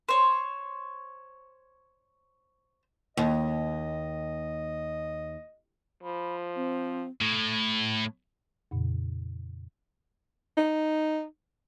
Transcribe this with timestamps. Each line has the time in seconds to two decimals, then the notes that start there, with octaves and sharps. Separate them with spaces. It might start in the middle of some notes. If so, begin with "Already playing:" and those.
0.09 C5 C#5
3.17 D#2 D#5
6.03 F3 B5
6.56 C4
7.20 A2
8.71 F2 A#2 C#3
10.57 D#4